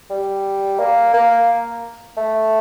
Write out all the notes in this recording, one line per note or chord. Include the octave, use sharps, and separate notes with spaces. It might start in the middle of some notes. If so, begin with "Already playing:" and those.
G3
A#3
A#3
A3